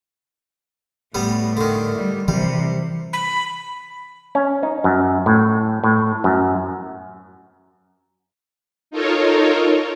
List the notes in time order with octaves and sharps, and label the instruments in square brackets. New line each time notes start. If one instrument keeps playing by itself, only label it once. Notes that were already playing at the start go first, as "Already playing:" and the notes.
[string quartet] A2 [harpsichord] G3 B3
[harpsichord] D3 D#3
[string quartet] G3
[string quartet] C3 [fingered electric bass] E3 [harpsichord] G3
[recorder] B5
[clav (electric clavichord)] C#4
D#4
F#2
A2
A2
F#2
[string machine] D#4 F4 A4 A#4 C#5